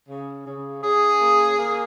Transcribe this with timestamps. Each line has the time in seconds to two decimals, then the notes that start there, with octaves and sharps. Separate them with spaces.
0.09 C#3
0.46 C#3
0.83 C#3 G#4
1.20 A#3
1.57 A#3